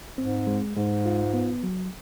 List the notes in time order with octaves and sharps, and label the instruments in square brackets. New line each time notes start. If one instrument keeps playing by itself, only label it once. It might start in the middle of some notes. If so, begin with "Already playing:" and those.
[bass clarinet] G#2 [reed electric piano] C4
[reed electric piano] G#3
[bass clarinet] G#2 [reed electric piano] G#3
[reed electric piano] F4
B3
F#3